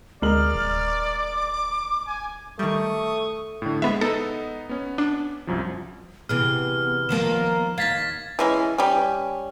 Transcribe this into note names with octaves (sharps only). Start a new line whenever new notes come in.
D2 G#3 A#4 D5 F6 F#7
D#1
D6
G#5
D#3 G3 A3 C#6 D#6
A2 D3
G#3 B3 E5
B3 D#4 A4 D#5
B3 C#4
D4
C2 F#2 F3
C3 E3 B3 G#4 F6
D#3 F3 A#3 E7
D#2 F5 G#6 A6 B6
E3 G#3 C#4
G3 C#4